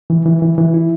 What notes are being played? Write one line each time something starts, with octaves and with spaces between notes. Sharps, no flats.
E3
E3
E3
E3
E4